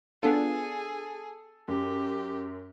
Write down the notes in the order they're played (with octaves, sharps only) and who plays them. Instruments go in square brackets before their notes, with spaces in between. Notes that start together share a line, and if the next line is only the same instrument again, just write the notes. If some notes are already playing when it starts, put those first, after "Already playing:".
[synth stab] B3 D4 F4 [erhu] G#4 [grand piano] A4
[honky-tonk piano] F#2 [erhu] G4